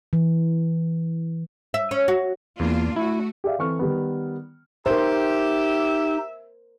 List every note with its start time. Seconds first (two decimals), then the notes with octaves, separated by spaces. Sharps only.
0.13 E3
1.74 E5
1.91 C#4
2.08 F#4
2.60 E2 A#3 D4 F4
2.96 A3 E4 F#4
3.44 G4 G#4 D5 E5 F5
3.59 E3 C4 A4 C#6 F6
3.79 D#3 G3 B3
4.86 D#4 G4 A#4 C5 E5